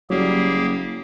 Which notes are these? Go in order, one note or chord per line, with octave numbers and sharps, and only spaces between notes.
F#1 F#3 G3 A#3 G4 G#4